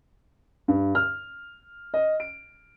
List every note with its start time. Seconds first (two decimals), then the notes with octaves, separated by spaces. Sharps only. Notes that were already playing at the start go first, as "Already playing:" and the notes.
0.68 G2
0.95 F6
1.94 D#5
2.20 D7